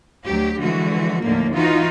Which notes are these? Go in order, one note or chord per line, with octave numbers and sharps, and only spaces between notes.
D2 F#3 G4
D3 E3 F3 G#3 F#4
D#2 A2 D3 F3 A#3
E3 D#4 F4 F#4